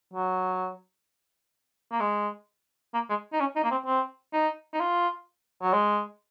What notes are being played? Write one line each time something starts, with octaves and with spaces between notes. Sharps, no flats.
F#3
A#3
G#3
A#3
G#3
D#4
C#4
D#4
A#3
C4
C4
D#4
D#4
F4
F#3
G#3